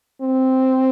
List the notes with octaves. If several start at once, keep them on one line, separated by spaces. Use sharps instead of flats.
C4